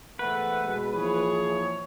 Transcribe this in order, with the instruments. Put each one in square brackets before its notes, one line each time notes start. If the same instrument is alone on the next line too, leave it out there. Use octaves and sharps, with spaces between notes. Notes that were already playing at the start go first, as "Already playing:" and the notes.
[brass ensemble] E2 G#2 A3 [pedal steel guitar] B4 [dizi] F#5
[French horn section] B2 G#3 G#4
[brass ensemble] A#2 C#5 [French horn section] E3 F3 [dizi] G#4